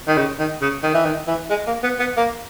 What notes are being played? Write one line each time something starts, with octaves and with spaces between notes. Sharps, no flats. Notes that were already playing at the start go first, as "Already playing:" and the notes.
D#3
C#3
D#3
C#3
D#3
E3
D#3
E3
G#3
A#3
B3
B3
A#3